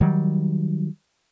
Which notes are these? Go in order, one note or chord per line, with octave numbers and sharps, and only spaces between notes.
D#3 F#3 G3